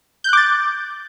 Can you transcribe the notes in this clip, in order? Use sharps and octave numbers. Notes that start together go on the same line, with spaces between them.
D6 F#6 G6 A6